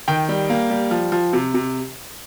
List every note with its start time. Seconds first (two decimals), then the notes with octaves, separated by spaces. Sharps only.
0.08 D#3 G5
0.29 G3
0.50 A#3
0.70 G3
0.91 F3
1.12 F3
1.33 C3
1.54 C3